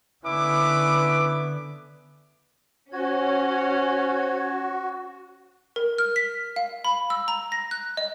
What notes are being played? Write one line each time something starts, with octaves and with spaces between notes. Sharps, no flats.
D3 B3 C#4 E4 B4 D6
C#4 F#4 C5 C#5 G#6
A#4
F6
B6
F5
B5
E6
A#5
A#6
F#6
D#5